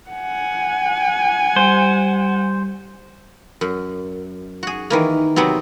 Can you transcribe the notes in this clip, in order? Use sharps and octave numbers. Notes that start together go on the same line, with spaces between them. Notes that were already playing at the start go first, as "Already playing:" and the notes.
F#5 G#5
G3 C5
F#2
F#4 G#4
D#3 E3 A#3
C3 F#3 B3 C4